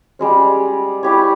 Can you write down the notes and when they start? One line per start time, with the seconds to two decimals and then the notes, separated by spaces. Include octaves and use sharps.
0.19 G3 G#3 C#4
1.03 E4 G4 C#5